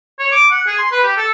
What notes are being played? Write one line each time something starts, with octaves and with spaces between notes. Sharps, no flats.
C#5
D6
F#5
G#4
C6
B4
G4
A4